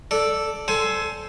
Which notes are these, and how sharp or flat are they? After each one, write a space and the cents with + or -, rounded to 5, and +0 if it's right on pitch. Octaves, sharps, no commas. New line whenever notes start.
A4 +0 D5 +0
A4 +0 C5 +0 G#5 +20